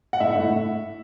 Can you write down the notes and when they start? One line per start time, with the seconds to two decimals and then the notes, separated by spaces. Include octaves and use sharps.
0.13 F#5
0.20 A2 E5
0.35 A2